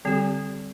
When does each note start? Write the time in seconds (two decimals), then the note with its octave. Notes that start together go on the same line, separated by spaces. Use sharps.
0.05 D3 G3 C4 G4